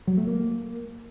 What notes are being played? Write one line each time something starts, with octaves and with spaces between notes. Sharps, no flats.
F#3
A3
A#3